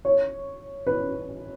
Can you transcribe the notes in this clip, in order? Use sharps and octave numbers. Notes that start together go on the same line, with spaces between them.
C#5
B4